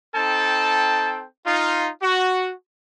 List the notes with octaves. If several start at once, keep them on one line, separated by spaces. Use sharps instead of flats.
C4 D#4 A4 G5 A5
D#4 F4
F#4